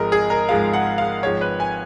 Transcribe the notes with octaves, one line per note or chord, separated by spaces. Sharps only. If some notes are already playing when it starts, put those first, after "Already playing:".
Already playing: G#1 G#2 F3 G#3 A#4 D#5
G#4
A#4
G#1 G#2 F3 G#3 F5
F#5
F5
G#1 G#2 F3 G#3 C#5
B4
G#5